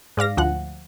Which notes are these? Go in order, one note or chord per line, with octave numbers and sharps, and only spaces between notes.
G#2 D5 F5 A#6
D2 F3 F#5 F#6